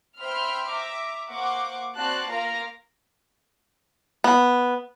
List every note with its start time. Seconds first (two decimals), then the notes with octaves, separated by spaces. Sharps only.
0.20 C5 E5 G5 B5 C6 F6
0.70 E5 A#5 D6
1.30 A#3 C5 F#5 C#6 D6
1.96 C4 F#4 D5 A5 F#6 C7
2.30 A#3 F4 A#4 F5 A#5 A#6
4.24 B3